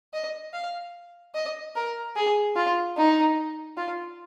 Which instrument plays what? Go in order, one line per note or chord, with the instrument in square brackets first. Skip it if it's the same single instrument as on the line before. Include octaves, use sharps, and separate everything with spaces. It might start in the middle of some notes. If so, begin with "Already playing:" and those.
[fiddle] D#5
F5
D#5
A#4
G#4
F4
D#4
F4